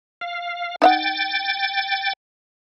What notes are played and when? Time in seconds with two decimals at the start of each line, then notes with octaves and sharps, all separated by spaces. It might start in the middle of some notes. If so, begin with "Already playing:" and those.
0.21 F5
0.82 D#4 E5 F#5 G5 A6